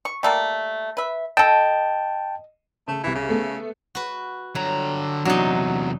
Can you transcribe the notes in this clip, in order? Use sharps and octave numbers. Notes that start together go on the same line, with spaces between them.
C#6
G3 A3 A#3
B4 E5
A4 D#5 G5 A5
C#3 A3
C2 E3 E5
C#3
A3 B3 A4
F#4 B4
D3 F#3 A#5
E2 C3 F#3 D4 D#4